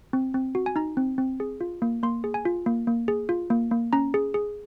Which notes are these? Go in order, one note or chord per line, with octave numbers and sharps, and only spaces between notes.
C4
C4
F#4
G#5
D#4 A#5
C4
C4
G#4
F4
A#3
A#3 C6
G#4
G#5
F4
A#3
A#3
G#4
F4
A#3
A#3
C#4 A#5
G#4
G#4